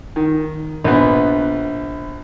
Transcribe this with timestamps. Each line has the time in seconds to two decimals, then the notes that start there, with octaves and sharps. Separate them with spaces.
0.16 D#3
0.84 A#1 B3